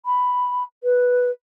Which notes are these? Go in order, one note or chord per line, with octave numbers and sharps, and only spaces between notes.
B5
B4